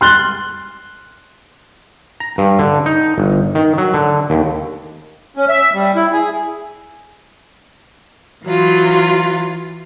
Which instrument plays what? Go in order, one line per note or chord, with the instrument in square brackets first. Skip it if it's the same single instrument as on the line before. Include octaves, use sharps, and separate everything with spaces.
[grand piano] C6 F6 F#6 A6 G7
[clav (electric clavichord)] A#5
G2
D3
D#4
G1
D#3
F#3
D3
D#2
[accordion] C#4
E5
G3
E4
G#4
[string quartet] E3 F#3 F4